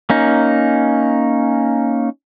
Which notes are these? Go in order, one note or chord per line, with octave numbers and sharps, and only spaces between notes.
A#3 C#4 D#4